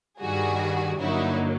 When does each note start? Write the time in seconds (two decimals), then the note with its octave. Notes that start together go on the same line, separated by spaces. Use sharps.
0.19 G2 D#3 G3 F#4 G#4
0.99 G2 D3 F#3 A#3 D#4 E4 F#4